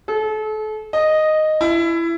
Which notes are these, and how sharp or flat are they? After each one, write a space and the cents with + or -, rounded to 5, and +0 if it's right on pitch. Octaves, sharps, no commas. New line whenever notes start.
A4 -35
D#5 -5
E4 +20